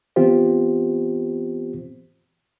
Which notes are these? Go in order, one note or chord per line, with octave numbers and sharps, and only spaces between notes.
E3 B3 C4 F4 G4 C5